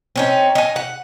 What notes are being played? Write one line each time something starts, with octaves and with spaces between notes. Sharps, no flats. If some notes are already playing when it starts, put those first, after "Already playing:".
C4 C#4 D#4
D#4 G#5
F#5